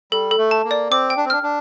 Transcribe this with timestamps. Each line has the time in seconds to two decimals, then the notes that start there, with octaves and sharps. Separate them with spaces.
0.12 G3 A4
0.31 A4
0.38 A3
0.51 A5
0.65 A#3
0.71 D5
0.90 C4 D6
1.10 G5
1.17 D4
1.25 C4
1.30 D4 F6
1.43 D4